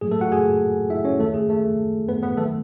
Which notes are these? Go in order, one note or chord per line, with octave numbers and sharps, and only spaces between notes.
A2 F#3 A3 G#4
A3 A4
F#4 F#5
G#4 G#5
E4 E5
C#4 C#5
D#2 D#3 A3 A4
G#4
A3 A4
B3 B4
B3 B4
D#3 F#3 A3 A4